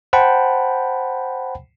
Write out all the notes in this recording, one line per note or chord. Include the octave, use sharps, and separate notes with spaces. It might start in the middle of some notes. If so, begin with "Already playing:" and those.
C5 F#5 G5 A5 B5